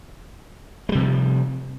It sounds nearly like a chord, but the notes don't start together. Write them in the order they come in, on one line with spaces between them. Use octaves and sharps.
G#3 G3 C3 F3